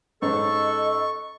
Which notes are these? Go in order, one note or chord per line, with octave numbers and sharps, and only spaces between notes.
G#2 C#4 A4 D#5 C#6